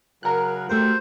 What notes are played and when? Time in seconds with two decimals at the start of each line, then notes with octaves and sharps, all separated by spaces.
0.23 C#3 F#3 A#4 F#6
0.69 A3 F#4 G4 C5